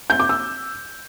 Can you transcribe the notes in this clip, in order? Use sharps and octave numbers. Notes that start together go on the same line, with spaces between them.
G6
D6
E6